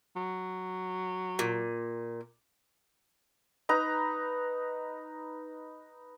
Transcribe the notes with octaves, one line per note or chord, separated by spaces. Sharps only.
F#3
A#2
D#4 B4 A#5